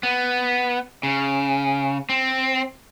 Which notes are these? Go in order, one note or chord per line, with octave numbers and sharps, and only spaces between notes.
B3
C#3
C4